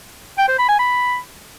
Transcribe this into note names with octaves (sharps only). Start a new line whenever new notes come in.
G5
C5
B5
G#5
B5